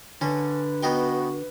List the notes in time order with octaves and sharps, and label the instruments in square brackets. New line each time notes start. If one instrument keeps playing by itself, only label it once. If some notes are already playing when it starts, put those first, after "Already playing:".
[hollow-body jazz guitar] D3 [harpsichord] C#4 [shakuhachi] B4
[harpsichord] B3 D#4 G5 [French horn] F#4